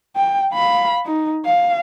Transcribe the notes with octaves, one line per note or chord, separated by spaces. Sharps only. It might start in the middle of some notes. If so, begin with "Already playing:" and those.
G5
F5 B5
D#4
F5